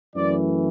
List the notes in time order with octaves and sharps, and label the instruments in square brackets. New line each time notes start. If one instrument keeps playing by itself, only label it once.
[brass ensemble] F#2 E3 A3 D5